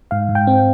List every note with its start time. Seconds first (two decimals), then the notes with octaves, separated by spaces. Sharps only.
0.11 G#2 F5
0.29 G#2
0.35 G5
0.47 C4